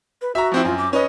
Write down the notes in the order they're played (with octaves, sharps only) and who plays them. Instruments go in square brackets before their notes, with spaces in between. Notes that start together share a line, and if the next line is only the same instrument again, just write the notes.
[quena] B4
[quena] F#4 [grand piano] E5 A#5
[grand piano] F3 C4 E4
[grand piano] F#2 [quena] F4
[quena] D6
[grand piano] C#4 D#5 [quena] B4